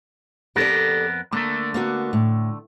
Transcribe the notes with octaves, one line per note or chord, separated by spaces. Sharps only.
F2 B3 G4 A4 A#4 D5
D3 A3 A#3
A#3 B3 F#4
A2